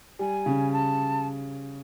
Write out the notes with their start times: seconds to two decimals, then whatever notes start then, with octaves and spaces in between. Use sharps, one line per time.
0.19 G3 G#5
0.46 C#3
0.72 A5